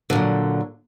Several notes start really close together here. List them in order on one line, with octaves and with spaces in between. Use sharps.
D3 A#2 F#3